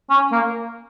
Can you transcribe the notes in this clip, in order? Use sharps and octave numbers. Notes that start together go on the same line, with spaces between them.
C#4
A#3